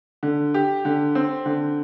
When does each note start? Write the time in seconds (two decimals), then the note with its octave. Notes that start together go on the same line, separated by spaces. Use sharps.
0.23 D3
0.54 G4
0.85 D3
1.15 C4
1.46 D3